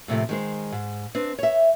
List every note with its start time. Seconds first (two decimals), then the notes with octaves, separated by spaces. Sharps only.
0.08 A2 C3 F3 A3
0.29 D#3 G#3 C5
0.72 G#2
1.15 C4 D4 B4
1.39 C#5 E5